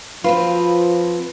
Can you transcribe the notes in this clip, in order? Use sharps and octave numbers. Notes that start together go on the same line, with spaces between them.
F3 C4 F4 F#4 B4